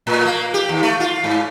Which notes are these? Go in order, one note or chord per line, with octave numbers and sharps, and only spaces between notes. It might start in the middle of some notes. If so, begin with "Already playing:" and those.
A2
A#3
G4
D#2
A3
F4
G#2